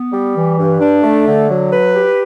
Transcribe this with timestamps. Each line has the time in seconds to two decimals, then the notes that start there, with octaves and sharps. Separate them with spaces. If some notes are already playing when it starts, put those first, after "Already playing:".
Already playing: B3
0.11 G3
0.35 E3
0.58 G2
0.80 D4
1.03 A3
1.26 D3
1.49 F#3
1.71 B4
1.94 G4